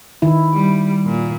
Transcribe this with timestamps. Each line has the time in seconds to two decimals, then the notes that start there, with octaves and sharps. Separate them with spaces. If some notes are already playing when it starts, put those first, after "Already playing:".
0.22 D#3 E4
0.54 G3
1.06 A#2